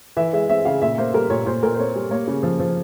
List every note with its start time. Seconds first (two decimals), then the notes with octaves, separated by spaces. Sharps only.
0.17 E3 E5
0.33 G#3 E5
0.49 C4 E5
0.65 C#3 F5
0.82 A#2 E5
0.98 A#3 C5
1.14 G3 A#4
1.30 A#2 C#5
1.46 A#2 C5
1.63 A#2 A#4
1.74 C5
1.79 C4 C#5
1.95 G3
2.11 A#3 C#5
2.28 C#3
2.43 F3
2.59 F3